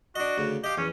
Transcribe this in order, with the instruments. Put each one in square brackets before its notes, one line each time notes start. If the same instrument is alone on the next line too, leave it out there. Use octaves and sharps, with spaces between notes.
[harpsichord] D4 D#5 [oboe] F#4
[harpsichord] D2 C#3
[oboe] G4 [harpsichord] D#5 F5
[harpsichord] E2 [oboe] C#4